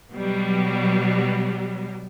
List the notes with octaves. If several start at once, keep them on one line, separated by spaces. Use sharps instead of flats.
B2 F#3 G3